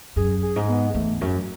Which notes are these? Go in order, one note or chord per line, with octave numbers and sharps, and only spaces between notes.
F#2 G#4
G#4
G#2
B3
E2 A3
F#2 F#3